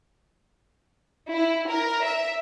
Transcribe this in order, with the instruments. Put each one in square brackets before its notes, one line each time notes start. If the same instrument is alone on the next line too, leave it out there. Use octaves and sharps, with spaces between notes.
[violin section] E4
A#4
E5